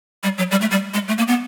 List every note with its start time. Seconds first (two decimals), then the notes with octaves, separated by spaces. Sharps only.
0.23 G3
0.38 F#3
0.51 G3
0.61 A3
0.71 G3
0.94 G#3
1.08 A3
1.18 A#3
1.28 B3